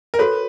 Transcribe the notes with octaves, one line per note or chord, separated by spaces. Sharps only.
A#4
F#4 A4 B4 C#5